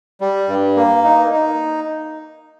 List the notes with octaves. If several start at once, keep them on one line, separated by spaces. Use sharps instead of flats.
G3
G2
A#3
D#4
D#4